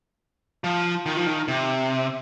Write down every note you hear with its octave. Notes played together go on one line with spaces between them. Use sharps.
F3
D#3
F3
D#3
C3